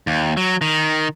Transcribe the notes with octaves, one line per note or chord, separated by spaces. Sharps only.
D#2
F#3
D#3